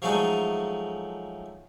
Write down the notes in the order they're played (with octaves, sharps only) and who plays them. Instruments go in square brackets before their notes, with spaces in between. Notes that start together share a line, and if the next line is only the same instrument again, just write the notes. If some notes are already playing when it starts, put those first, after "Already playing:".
[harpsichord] F3 F#3 G#3 A3 D#4